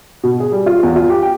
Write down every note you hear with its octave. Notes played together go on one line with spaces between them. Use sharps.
B2
G#4
G3
F4
E2
F4
G4
G5